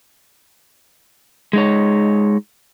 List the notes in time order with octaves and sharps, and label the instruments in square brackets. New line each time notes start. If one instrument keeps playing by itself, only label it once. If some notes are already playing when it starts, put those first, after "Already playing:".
[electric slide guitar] G#3 D#4 C#5